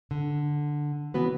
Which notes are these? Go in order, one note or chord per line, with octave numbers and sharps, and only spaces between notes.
D3
C#3 E3 B3 F#4 B4